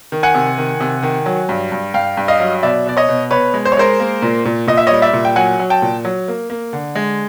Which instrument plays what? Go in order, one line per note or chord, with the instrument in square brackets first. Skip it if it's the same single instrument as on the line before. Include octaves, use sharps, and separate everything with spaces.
[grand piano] D#3
F#5 G#5
C3
D#3
C3
D#3
F#3
G2
G2
G2 F5 G5
G2
D#5 F5
F#3
B2 D5 E5
B2 D5
C#5 D#5
B2
B2 B4 C#5
G#3
C5
C#5
G#3 A#4 C5
A#3
A#2
A#2
A#2 D#5
E5
G3 C#5 D#5
D5 E5
A#2
G5
F#3 F#5 G#5
F#3
G5 A5
A#2
F#3
A#3
A#3
D3
G#3